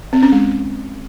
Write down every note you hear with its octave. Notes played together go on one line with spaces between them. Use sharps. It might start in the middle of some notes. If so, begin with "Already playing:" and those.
C4
C#4
G#3